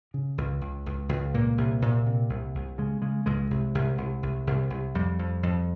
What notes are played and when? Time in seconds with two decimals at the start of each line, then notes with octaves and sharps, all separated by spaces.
0.14 C#3
0.38 C#2
0.61 C#2
0.86 C#2
1.09 C#2
1.34 A#2 A#3
1.58 C2
1.82 A#2
2.06 C3
2.29 C2
2.55 C2
2.78 C#3 G#3
3.02 C#3 G#3
3.26 C#2 G#3
3.51 C2
3.75 C2
3.98 C2
4.23 C2
4.47 C2
4.70 C2
4.95 F2 G3
5.19 F2
5.43 F2